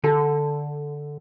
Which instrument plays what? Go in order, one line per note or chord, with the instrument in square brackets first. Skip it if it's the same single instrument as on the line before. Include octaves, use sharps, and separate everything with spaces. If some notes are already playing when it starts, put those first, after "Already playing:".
[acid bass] D3 [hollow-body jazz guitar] A4